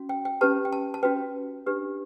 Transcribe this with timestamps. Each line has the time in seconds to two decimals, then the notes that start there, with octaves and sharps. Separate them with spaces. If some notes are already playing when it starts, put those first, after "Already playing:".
Already playing: C#4 F#4
0.09 G5
0.25 G5
0.41 C#4 G4 B4 A5
0.65 G5
0.73 A5
0.94 A5
1.03 C#4 F#4 B4 G5
1.66 D4 G4 B4